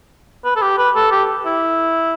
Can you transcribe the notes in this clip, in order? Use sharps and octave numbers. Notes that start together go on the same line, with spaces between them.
B4
A4
G4
B4
A4
G4
E4